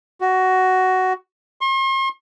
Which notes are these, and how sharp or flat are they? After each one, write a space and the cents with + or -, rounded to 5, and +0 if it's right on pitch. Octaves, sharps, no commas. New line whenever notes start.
F#4 +10
C6 +45